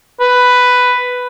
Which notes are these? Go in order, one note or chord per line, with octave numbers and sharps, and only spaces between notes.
B4